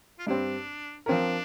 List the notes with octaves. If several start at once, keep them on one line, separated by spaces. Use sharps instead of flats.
F4
G2 G3 C4 D4
F3 C4 D4 A#4